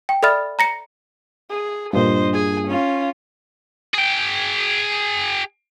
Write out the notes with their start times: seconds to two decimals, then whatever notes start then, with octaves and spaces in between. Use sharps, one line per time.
0.09 G5
0.23 A4 D5 E5 B5 F6 A6
0.59 A#5 A#6 C#7
1.50 G#4
1.93 G2 A#2 C5 D#5
2.33 G#4 G#5
2.68 C#4 F4
3.94 G#4 G5